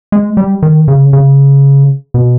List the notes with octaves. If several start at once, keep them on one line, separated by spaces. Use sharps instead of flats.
G#3
G3
D#3
C#3
C#3
B2